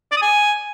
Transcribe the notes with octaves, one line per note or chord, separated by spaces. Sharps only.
D5
D#6
G#5